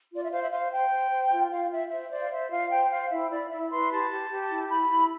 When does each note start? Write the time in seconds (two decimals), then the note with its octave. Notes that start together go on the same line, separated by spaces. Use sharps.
0.10 F4 D5
0.23 E5
0.30 C5 F5
0.41 E5
0.50 C5 F5
0.71 C5 G5
0.90 C5
1.10 C5
1.30 F4
1.50 F4 F5
1.71 F4 E5
1.90 C5 E5
2.10 C5 D5
2.21 F5
2.30 C5 E5
2.50 F4 F5
2.70 C5 G5
2.90 C5 F5
3.10 E4 E5
3.30 E4 D5
3.49 E4 E5
3.70 B4 C6
3.89 G4 A5
4.10 G4
4.30 G4
4.49 E4
4.69 E4 B5
4.89 E4